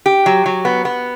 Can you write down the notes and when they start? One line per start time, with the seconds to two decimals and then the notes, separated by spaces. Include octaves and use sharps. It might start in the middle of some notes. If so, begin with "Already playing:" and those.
0.06 G4
0.26 F#3
0.46 F#3
0.65 B3
0.85 B3